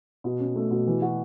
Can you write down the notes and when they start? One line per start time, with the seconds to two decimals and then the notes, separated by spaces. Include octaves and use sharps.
0.24 B2
0.40 C#4
0.56 A3
0.71 B2
0.87 E3
1.02 F#4